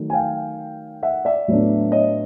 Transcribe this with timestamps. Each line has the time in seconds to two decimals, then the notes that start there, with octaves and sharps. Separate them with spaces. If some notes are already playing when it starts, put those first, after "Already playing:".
Already playing: D#3 F#3 A3
0.10 G#5
0.13 F5 G5
1.03 E5 F#5
1.25 D5 E5
1.48 A2 F#3 B3 D4
1.92 C#5 D#5